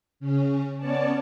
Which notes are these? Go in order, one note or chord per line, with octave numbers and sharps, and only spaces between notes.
C#3 C#4
B3 C#4 C#5 D5 A5